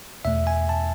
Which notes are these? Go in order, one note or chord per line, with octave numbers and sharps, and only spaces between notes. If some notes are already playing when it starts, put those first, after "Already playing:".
E2 B2 A3 E5
G#5
A5